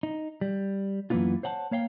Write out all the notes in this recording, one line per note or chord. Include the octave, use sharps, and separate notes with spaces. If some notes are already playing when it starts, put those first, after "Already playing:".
D#4
G3
F#2 E3 A#3 B3 D4 F4
C5 C#5 F#5 G5 A5
A#3 C#5 F5 G5